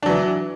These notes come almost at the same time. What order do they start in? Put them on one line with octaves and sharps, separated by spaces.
D4 F#3 E3